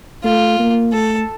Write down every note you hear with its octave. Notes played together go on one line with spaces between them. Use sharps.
A3 F4
A#3
A3 A4